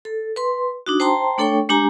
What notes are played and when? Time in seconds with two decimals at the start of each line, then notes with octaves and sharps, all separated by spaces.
0.05 A4
0.36 B4 C6
0.86 D4 D#4 F#4
1.00 C5 G5 A5 A#5 C6
1.38 A3 D4 A4 C#5 G5 C#6
1.69 G#3 D4 G4 G#5 A#5